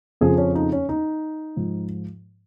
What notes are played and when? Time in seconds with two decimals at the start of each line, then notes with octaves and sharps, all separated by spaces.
0.21 F2 C#3 F3 G#4
0.38 C#4
0.55 D#4
0.72 C#4
0.89 D#4
1.56 G#2 F3